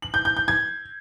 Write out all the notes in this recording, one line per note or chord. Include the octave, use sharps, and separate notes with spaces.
F#7
G6
G6
G6
G#6